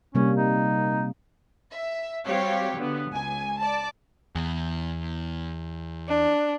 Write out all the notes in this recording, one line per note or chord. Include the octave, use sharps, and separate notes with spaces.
C3 G3 A#3 C#4
D#4
E5
G3 C4 F#4 G4 C#5 F5
D3 B3
C#2 G#5
D5 A5 D6
E2
D4